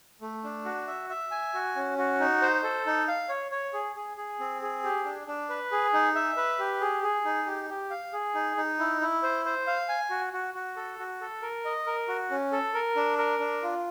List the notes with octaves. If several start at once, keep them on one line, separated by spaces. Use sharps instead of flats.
A3
D4
F#4
E5
E5
G#5
F#4
C#4
F#4
D#4
C5
A4
D#4
F5
C#5
C#5
G#4
G#4
G#4
C4
G#4
G4
D4
D4
B4
G#4
D#4
E5
B4
G4
G#4
G#4
D#4
G4
G4
F5
G#4
D#4
D#4
E4
E4
C5
C5
F5
G#5
F#4
F#4
F#4
A4
F#4
A4
A#4
D#5
A#4
F#4
C#4
A4
A#4
D4
A#4
D4
F4